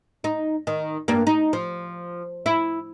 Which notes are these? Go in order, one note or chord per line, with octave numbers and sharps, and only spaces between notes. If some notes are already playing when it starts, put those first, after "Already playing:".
D#4
D#3
G2 A#3
D#4
F3
E4